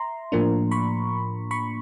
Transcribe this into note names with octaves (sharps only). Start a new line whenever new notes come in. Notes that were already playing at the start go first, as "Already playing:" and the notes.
Already playing: E5 A#5 C6
A2 F3 A#3 D4
B5 C#6
B5 C#6